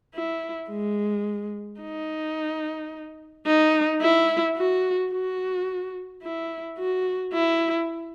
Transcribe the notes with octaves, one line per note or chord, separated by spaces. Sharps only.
E4
G#3
D#4
D#4
E4
F#4
F#4
E4
F#4
E4